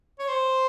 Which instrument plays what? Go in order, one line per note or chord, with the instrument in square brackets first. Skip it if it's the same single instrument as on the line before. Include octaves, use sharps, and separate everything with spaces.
[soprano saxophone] C#5
C5